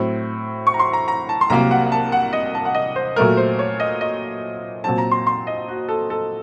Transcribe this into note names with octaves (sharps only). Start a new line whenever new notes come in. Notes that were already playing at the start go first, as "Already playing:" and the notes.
Already playing: A2 F#3 C4
C#6
A#5
C6
A#5
A#5
A5
C6
C2 C3 F#3 A#3 A#5
F#5
A5
F#5
D#5
A5
F#5
D#5
C5
A#2 F#3 A3 A#4
C5
C#5
D#5
D#5
A#2 F#3 C4 A5
A#5
C6
C6
D#5
F#4
A4
A4